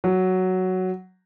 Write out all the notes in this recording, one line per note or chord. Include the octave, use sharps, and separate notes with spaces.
F#3